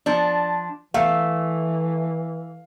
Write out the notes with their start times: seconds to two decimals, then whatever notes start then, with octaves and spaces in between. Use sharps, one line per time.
0.06 F3 D4
0.94 E3 A3 F5